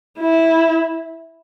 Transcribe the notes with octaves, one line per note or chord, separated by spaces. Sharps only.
E4